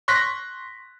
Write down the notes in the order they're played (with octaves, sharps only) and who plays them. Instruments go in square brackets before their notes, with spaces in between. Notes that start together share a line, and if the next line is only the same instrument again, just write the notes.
[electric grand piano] C6 C#6 F#6 A#6 B6